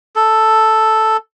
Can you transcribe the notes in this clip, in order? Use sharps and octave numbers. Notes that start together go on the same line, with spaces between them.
A4